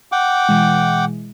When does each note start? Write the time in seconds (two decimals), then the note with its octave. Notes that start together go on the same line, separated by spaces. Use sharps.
0.12 F#5 G5 D6
0.49 B2 E3 G#3